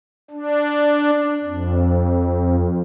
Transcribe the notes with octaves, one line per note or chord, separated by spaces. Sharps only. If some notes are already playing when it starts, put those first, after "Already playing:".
D4
F2